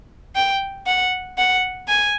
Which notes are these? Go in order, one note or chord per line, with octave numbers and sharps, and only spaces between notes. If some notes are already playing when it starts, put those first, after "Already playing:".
G5
F#5
F#5
G#5